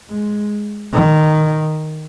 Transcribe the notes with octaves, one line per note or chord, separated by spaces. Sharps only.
G#3
D#3